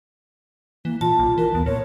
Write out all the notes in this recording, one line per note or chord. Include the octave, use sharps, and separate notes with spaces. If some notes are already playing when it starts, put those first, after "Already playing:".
E3 A#3
A#2 F4 A5
B1
E3 A#4
D#2 B3
A#2 C#5